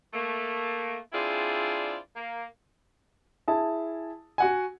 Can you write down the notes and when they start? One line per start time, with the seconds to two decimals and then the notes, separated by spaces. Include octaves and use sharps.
0.13 A3 A#3
1.13 C4 D4 E4 F4 G#4 D5
2.15 A#3
3.48 E4 G#4 A5
4.38 F#4 F#5 G#5